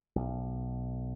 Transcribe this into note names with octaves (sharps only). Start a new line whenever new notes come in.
B1